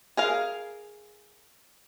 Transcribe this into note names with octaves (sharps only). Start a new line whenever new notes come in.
G#4 A#4 F5